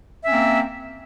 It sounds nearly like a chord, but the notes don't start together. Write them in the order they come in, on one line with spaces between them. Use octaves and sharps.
E5 C#4 C4 A#3